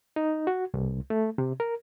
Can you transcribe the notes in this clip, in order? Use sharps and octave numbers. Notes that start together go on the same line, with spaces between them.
D#4
F#4
C2
A3
C3
A#4